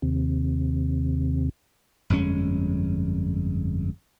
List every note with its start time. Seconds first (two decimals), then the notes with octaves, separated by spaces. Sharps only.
0.02 D#2 C3
2.10 G1 F2 G#3 C#4